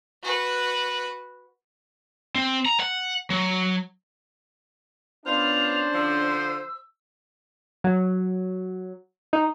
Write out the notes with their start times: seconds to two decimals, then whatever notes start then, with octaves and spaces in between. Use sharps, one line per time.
0.23 F#4 B4
2.35 C4
2.66 A#5
2.80 F#5
3.30 F#3
5.26 B3 C#4 D4 F4 C5 F7
5.94 D3 F3 E6
7.84 F#3
9.33 D#4